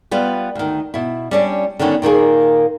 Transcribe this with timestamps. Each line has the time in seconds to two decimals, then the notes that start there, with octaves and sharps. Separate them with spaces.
0.11 G3 B3 F4 B4
0.55 D2 D#3
0.94 B2 E4
1.31 G3 C#4 D4
1.79 D3 D#3 G3 B3 C#4
2.02 A#2 D#3 A#3 G#4